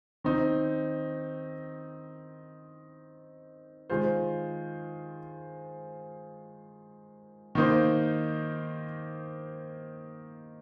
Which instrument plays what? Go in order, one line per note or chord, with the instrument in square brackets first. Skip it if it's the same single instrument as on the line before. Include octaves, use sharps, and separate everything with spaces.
[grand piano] D#3 C4 D#4
D#3 G#3 F4 C5
D#3 A#3 D#4 C5